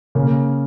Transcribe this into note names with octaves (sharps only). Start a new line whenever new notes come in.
C#3 A#3 C#4